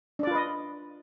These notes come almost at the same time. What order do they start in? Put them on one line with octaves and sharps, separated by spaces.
D4 D5 F4 B4 D#5